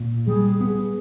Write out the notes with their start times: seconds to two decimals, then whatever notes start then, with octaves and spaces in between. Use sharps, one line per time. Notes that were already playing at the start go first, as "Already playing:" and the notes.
Already playing: A#2
0.27 G3 G#4
0.60 B3